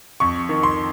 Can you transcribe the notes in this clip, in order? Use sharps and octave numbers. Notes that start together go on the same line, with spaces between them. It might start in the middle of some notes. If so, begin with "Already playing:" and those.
F2 C#6
D#3
C6